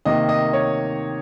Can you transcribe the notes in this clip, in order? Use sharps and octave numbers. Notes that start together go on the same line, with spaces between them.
C3 D#3 A#3 D#5
D#5
C#5